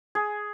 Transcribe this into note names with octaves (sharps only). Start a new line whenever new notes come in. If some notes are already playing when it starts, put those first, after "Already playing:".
G#4